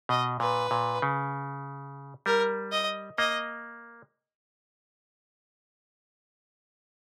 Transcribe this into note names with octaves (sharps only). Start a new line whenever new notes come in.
B2 D#5
A#2 B4
A#2
C#3
G3 A#4
D#5
A#3 D#5